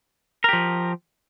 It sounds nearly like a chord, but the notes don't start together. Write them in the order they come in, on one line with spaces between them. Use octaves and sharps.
A#4 G4 F3